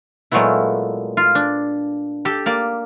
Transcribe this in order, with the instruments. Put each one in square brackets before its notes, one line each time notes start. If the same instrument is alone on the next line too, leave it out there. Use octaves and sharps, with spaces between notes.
[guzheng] A#2 F#3 G#3 A3 B3 E4
F4
D4
G4 A4 G5
A#3 D5